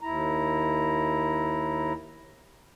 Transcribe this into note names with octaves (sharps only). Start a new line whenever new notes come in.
D#2 E4 A#5